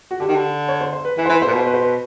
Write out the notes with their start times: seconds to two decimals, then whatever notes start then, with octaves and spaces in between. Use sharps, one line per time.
0.11 F#4
0.20 D3 G4
0.28 D#3
0.36 D3
0.69 C#5
0.81 C5
0.93 C5
1.05 B4
1.17 E3 B4
1.25 C5
1.29 E3
1.33 B4
1.42 C5
1.47 A#2
1.50 B2 B4
1.59 C5
1.67 B4
1.74 C5
1.83 B4